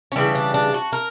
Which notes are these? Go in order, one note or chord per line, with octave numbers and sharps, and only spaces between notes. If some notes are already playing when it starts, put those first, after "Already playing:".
C#4
C#3 E3 G3 D4
D4
D4
F#4
A#4